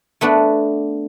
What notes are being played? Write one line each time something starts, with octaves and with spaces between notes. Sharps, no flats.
A3 B3 D4